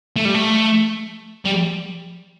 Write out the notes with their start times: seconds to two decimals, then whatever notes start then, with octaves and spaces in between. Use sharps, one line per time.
0.16 A3
0.25 G3
0.35 A3
1.45 G3